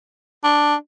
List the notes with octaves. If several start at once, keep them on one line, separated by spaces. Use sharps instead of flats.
D4